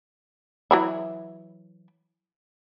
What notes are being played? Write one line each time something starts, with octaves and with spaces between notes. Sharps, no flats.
E3 F#3 E4